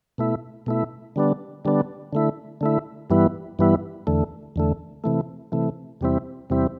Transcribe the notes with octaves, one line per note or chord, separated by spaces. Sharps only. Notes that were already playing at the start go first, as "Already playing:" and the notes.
B2 A3 E4
B2 A3 E4
D3 G3 B3 D4
D3 G3 B3 D4
D3 A3 E4
D3 A3 E4
G2 E3 G3 B3 E4
G2 E3 G3 B3 E4
E2 D3 A3
E2 D3 A3
C3 E3 A3
C3 E3 A3
E2 C3 G3 C4 E4
E2 C3 G3 C4 E4